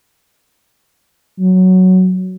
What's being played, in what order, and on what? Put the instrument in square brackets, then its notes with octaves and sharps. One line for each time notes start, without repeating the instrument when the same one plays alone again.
[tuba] F#3